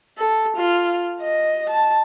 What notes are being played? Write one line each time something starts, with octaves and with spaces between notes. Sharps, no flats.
A4
F4
D#5
A5